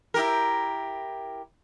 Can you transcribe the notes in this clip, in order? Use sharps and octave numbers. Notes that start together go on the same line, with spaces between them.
E4 G4 A#4